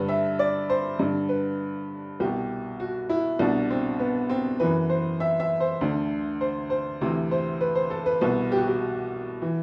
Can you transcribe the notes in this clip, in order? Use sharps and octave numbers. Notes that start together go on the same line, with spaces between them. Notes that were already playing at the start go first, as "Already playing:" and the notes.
Already playing: G2 D3 B4
E5
D5
C5
G2 D3
B4
C2 B2 G4
F#4
E4
C2 B2 D4
C4
B3
C4
F#2 E3 B4
C5
E5
E5
C5
D2 D3
C5
C5
D2 C3 E3
C5
B4
C5
A4
B4
C2 B2 B4
G4
F#4
G4
E3